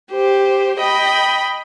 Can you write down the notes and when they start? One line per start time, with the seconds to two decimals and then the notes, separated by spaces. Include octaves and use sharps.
0.10 G4 C5
0.80 D#5 G5 B5